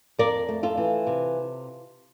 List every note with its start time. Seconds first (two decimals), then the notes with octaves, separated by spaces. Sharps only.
0.19 F2 A#4 D5
0.49 A3
0.63 F4 A4
0.77 E3
1.07 C3